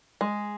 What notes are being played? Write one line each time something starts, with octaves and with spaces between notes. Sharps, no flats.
G#3